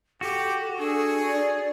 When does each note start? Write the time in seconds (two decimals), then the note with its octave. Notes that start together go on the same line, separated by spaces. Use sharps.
0.21 F#4 G4 A4
0.78 D4 G#4 A4
1.27 D5